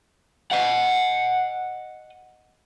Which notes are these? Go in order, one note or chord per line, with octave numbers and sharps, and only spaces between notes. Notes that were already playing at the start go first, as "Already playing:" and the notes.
D#5 F#5